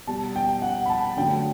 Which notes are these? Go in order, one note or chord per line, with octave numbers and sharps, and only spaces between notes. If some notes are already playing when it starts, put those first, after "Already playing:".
B2 G3 A5
G5
F#5
B5
A5
D3 F#3 A3 G5